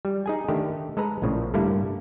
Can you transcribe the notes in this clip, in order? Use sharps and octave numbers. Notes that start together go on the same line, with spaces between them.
G3
D#4 G#4 G#5
D3 D#3 A3 G4
G#3 A4 B4 A#5
A#1 A2 C#3 F3
G2 D3 G3 A3 A#3 E4